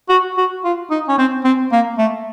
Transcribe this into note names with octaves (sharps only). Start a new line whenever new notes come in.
F#4
F#4
F4
D#4
C#4
C4
C4
A#3
A3